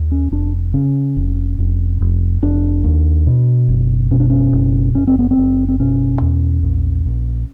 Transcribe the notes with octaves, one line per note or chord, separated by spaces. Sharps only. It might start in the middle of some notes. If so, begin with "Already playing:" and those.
Already playing: D#2
C#4
F1 D4
C#3 C#4
F1
F1
F1
F1 D4
D#2
B2
F#1
B2 C#4
D4
C#4
F#1
F#1 C#4
C4
B3
C4
F#1
C4
B2 C#4
E2
A#1
A#1